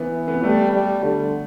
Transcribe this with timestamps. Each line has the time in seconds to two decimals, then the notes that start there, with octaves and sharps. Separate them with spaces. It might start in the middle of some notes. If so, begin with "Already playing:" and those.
Already playing: E3 B3
0.28 B3
0.43 G3 A3
0.73 G3
1.03 D3